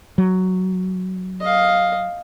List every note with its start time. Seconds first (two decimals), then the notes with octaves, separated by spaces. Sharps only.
0.18 F#3
1.41 D#5 F5